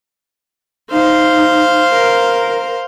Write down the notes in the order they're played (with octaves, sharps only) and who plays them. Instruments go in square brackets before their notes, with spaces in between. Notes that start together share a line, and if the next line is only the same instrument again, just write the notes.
[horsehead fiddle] D#4 [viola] C5 F5
[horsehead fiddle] A#4